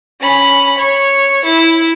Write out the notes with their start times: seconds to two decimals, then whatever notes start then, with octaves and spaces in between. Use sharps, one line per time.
0.20 C#4 B5
0.78 C#5
1.45 E4